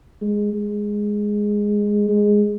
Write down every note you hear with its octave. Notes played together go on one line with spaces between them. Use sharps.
G#3
G#3
G#3